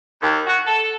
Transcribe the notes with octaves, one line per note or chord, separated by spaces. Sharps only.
D#2
F#4
A4